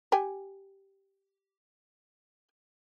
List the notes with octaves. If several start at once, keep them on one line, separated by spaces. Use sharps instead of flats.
G4 G5 G#5